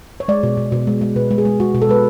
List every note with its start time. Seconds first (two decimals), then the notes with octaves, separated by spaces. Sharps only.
0.20 C#5
0.28 G#3 D5
0.43 B2
0.57 B2
0.72 B2
0.87 G#3
1.01 G#3
1.16 B2 B4
1.31 G#3
1.38 G#4
1.45 G#3
1.60 G#3 F#4
1.75 B2
1.82 A4
1.89 G#3 B4